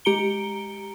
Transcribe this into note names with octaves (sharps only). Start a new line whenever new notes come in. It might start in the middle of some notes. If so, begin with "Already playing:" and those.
G#3 G4 A#5 C#7 D7 G7